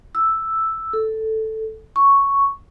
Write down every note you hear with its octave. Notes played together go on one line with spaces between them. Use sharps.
E6
A4
C#6